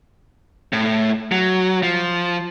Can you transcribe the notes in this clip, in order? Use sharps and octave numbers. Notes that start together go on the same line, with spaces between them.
A2
F#3
F3